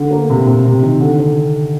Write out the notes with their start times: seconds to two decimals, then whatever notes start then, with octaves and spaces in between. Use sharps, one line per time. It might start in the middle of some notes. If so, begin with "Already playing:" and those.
Already playing: D3
0.11 A#3
0.30 C3
0.46 C3
0.65 C3
0.83 D#3
1.00 D3
1.18 D3